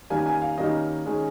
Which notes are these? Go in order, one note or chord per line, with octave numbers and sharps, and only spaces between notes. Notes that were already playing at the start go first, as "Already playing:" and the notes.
D#3 G3 A#3 C#4 G#5
G#5
F5
D#3 G3 A#3 C#4 D#5
D#3 G#3 C#4